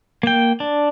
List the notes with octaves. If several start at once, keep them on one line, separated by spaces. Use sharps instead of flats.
A#3 G5
D4